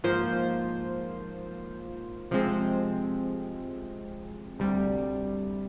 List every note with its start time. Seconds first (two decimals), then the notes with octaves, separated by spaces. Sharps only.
0.04 G#2 F3 A#3 F4 C5
2.31 C3 F3 G#3 C4
4.59 D2 C3 G3